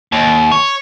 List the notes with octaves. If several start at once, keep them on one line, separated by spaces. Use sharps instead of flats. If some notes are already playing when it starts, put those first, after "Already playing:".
D#2
C#5